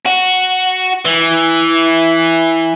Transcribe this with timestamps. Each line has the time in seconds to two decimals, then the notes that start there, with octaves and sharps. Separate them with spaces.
0.06 F#4
1.05 E3